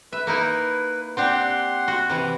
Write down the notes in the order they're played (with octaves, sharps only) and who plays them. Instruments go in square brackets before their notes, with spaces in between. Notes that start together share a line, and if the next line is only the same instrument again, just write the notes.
[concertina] B4 [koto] E5
[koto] A#3 D#4 E4
[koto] C4 D4 G4 [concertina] F#5 C6
[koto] F#4
C3 E3